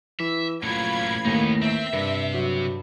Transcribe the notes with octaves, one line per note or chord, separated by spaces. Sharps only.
E3 E5
A1 A#2 F#3 F4 B5 G#6
D#2 A2 B3 D#4
C4 E5
G2 C3
F#3